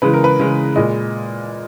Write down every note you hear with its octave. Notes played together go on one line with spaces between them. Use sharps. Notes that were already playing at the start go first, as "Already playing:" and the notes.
C#3 E3 G#3 B4
A#4
B4
C#3 E3 G#3
A#2 G#3 D#5